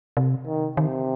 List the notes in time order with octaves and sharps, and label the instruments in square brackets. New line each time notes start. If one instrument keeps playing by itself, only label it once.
[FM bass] C3
[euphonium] D#3
[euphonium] C3 [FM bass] D#3